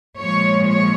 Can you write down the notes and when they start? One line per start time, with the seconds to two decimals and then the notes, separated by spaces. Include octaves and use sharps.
0.18 A#2 F3 G#3 C#5
0.65 C#5